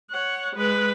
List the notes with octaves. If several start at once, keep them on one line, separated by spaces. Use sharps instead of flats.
C#5 F#5
G#3 B4